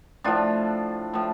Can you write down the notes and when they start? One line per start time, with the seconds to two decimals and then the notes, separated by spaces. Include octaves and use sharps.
0.24 A2 F3 D4 F4
1.14 A2 F3